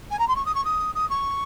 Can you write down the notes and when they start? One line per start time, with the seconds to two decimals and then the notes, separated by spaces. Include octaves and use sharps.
0.11 G#5
0.19 A#5
0.28 C6
0.36 C#6
0.46 D#6
0.55 C#6
0.65 D#6
0.95 D#6
1.10 C#6